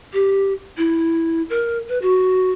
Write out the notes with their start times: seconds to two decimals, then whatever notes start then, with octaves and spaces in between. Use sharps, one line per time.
0.13 G4
0.77 E4
1.50 A#4
1.89 B4
2.02 F#4